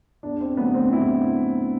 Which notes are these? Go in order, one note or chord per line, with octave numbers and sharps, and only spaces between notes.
E2 D4
C4
D3 F#3 A3 B3
C4
E2 E4